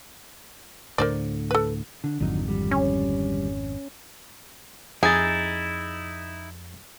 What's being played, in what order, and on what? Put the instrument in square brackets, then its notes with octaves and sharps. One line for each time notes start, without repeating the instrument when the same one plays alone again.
[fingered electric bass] D2 A2 D3 [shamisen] A#4 C5 D5
[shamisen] A4 B4
[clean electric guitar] D3
[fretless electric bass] G#1 F2 [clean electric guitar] D3 F#3 D#4
[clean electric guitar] D2 G3
[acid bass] C#4
[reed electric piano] F2 A6 [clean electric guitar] D#4 E4 [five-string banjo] G#4